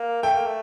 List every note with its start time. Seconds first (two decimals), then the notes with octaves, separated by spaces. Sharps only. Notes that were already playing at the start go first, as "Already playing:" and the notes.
Already playing: A#3
0.23 A3 G5
0.34 A#3
0.46 A3